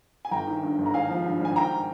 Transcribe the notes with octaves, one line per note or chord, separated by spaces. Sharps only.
G#5
G1 G5 A#5
D#3
G2
G1
A#5
G#1 F5 G#5
F3
G2
G#1 G#5
D#3 G5 A#5